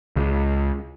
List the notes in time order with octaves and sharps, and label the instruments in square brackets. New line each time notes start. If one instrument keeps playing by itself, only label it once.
[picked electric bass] C#2